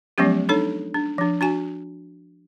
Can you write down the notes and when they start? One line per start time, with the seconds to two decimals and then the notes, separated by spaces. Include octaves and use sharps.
0.18 F3 F#3 G#3 B3 C#4 G4
0.49 D4 D#4 A4 C#5
0.94 D4
1.18 F3 D4
1.41 D4 F#4 G#5